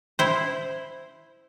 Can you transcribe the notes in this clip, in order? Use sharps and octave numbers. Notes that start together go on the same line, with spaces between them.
E4 C5